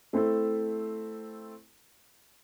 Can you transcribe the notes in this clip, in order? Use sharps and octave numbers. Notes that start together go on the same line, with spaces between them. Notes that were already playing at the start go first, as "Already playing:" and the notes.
A3 C4 E4 A4